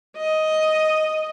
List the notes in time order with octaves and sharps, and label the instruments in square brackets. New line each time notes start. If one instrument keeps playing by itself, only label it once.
[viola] D#5